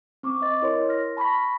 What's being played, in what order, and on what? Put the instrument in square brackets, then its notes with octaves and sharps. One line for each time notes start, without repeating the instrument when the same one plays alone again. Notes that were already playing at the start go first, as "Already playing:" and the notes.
[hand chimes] C4 C#6 D6
D#5 A6
E4 A#4 C#5 C6
F6 A#6
A5 B5 C#6 A#6 B6